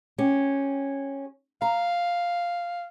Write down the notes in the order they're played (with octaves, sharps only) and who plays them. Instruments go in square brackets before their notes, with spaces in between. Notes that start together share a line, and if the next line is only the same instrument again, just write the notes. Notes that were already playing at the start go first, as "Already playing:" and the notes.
[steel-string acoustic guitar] C#4 G4
[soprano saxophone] F5 [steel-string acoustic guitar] A#5